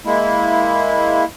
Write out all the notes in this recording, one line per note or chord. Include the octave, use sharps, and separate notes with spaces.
G#3 A#3 E4